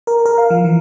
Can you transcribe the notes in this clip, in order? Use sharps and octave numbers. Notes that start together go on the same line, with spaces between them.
A#4
A#4
F5
F3
E3